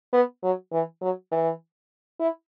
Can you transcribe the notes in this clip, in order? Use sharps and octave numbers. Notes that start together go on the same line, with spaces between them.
B3
F#3
E3
F#3
E3
E4